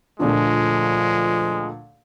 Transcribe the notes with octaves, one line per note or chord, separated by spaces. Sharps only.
D2 A#2 F3 G#3 A3